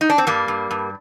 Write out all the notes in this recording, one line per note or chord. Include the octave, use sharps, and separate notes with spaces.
D#4
D4
C4
G2 G3 A#3
G2
G2